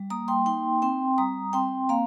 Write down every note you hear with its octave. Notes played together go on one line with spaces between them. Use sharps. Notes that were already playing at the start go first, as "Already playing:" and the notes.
Already playing: G3
A#3 A#5 D#6
G5 C6
D#4 G5 C6
C4 G5 C6
G3 A#5 D#6
C4 G5 C6
A#3 F5 A#5